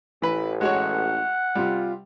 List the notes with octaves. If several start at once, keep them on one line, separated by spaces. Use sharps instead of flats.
A1 E3 B4
G#3 F#4 C#5 F#5
C3 G3 F4